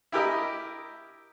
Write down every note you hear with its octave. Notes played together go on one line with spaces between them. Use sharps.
E4 G4 A#4 D#5